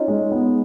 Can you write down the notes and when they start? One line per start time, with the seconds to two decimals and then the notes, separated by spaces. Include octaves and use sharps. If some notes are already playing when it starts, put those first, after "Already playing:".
Already playing: C#4 D#4 F4
0.08 G#3
0.31 B3